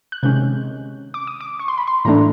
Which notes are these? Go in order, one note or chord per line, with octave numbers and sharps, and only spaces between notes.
F#6
C3 D#3 G#3 C#4 G6
D6
D#6
D6
C#6
C6
B5
C6
A2 E3 A3 D4 A#5